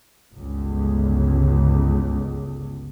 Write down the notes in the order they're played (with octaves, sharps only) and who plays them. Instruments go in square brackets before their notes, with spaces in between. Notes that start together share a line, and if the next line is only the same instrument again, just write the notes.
[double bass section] G1 C#2